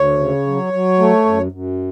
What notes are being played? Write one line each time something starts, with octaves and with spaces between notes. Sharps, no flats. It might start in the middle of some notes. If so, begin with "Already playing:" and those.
Already playing: D2 C#5
C#3
F#3
F#3
A3
F#2
F#2